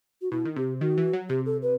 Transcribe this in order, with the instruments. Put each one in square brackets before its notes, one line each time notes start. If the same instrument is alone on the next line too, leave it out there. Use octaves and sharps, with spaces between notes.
[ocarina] F#4
[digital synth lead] B2 [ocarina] E4
[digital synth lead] D#3
[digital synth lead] C3 [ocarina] G4
[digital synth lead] D#3 [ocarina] F#4
[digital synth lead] E3
F#3
[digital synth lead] C3 [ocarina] G4
[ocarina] A4
B4